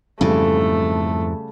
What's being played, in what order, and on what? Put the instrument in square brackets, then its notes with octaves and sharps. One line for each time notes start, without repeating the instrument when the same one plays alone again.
[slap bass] F2 G#2 E3 [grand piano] C#3 G3 [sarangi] A3 [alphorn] A4